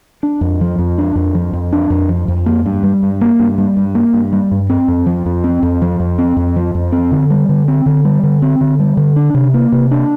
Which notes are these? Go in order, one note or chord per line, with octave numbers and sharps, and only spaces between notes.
D4
F2
F3
F2
D4
F2
F3
F2
D4
F2
F3
F2
A#3
G2
G3
G2
A#3
G2
G3
G2
A#3
G2
G3
G2
C4
F2
F3
F2
C4
F2
F3
F2
C4
F2
F3
F2
C4
D3
G3
D3
C4
D3
G3
D3
C4
D3
G3
D3
D4
C3
A#3
C3
D4